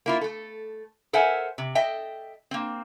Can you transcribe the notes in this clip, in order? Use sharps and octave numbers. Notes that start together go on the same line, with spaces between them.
A#3 E4 F4
A3 A4
A4 A#4 C5 E5 F#5 G#5
C3
A4 D#5 E5 G5
A#3 C4